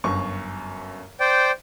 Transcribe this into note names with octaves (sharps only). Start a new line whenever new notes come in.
G1 F#2 C#6
C5 D5 G5